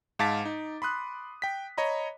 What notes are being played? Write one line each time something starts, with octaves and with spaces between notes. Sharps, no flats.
G#2 F5 A5 D6 A6 B6
D#4
B5 C6 D#6 F#6
G5 B6
C#5 D#5 A#5 B5